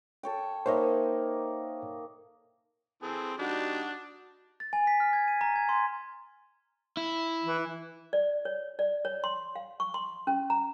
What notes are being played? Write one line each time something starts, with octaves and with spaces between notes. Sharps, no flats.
A4 C#5 G5
A#3 D#4 C5 C#5 D#5 E5
E3 C4 G#4 A4
G3 D4 D#4 F#4
A6
G#5
B6
F6
G#6
D#7
A#5
G#6
C6
E4
E3
D5
C#5
D5
C#5
C6
F5
C#6
C6
C#4
A#5